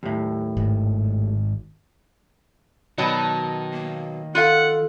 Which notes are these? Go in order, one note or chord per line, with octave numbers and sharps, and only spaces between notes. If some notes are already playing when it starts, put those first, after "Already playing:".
D#2 A2
G#1
B2 D#3 F#3 A5
A#3
F4 A4 F5 F#5